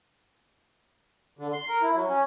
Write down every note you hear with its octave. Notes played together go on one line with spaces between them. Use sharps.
D3
C6
A#4
E4
F#3
C#4